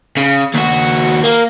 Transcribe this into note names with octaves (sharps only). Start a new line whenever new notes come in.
C#3
D#2 F#4
A#3